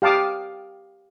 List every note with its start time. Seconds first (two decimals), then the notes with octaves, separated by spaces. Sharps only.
0.02 G4 F5 A5 D6 D#6